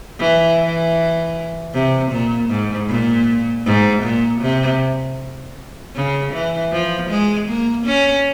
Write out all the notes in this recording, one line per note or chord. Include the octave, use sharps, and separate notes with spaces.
E3
E3
C3
A#2
G#2
A#2
G#2
A#2
C3
C#3
E3
F3
G#3
A#3
C#4